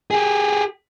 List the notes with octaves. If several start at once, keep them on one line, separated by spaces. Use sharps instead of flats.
G4 G#4